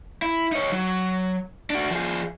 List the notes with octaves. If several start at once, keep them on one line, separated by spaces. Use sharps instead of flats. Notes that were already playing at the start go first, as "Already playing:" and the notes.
E4
D#4 C#5
F#3
D4 F#4
F3 G#4